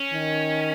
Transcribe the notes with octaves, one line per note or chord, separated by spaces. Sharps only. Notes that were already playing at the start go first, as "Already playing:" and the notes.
Already playing: C#4
D#3